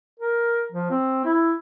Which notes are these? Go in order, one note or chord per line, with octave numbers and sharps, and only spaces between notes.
A#4
F3
C4
E4